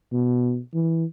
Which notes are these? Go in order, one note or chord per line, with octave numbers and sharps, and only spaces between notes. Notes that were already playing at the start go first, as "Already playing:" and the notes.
B2
E3